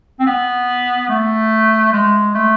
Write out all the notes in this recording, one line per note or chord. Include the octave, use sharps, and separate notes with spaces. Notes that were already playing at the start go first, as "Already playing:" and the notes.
C4
B3
A3
G#3
A3